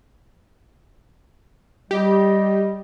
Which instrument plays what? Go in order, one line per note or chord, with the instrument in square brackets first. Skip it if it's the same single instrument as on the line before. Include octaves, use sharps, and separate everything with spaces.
[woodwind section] G3 D#5 [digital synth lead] G4